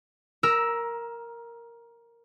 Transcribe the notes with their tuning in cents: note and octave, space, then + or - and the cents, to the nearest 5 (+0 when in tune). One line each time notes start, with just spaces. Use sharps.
A#4 +0 A#5 +20 E6 +0